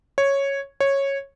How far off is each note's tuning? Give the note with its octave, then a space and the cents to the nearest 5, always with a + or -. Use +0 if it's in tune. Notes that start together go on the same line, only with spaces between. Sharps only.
C#5 -5
C#5 -10